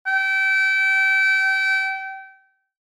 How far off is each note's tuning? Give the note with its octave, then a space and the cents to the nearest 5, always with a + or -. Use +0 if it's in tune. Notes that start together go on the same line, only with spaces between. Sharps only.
G5 -30